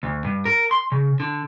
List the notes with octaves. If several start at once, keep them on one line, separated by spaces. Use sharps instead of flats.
D2
G2
A#4
C6
C#3
D3